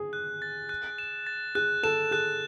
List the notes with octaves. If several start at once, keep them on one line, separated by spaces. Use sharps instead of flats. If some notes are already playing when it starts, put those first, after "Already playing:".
Already playing: G#4
F#6
A6
F#6
E7
A6
G#4 F#6
A4 E7
G#4 F#6